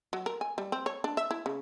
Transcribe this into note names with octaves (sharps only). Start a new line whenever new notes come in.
F#3
A#4
G#5
G3
C4
C#5
D4
E5
E4
C#3